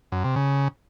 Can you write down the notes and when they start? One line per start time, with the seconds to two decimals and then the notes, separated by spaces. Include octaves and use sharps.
0.12 F#2
0.24 C3
0.36 C#3